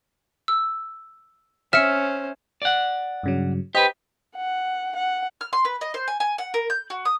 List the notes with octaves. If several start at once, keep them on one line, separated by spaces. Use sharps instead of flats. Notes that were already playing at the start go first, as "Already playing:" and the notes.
E6
C#4 C5 E5 F6 C#7
D5 F#5
G2 C#3 F#3
G4 B4 C5 D#5
F#5
F#5
F6
C6
B4
D#5
C5
G#5
G#5
F#5
A#4
G6
F#4
D#6